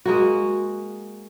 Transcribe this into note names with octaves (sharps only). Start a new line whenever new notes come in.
G#3 A#3 F#4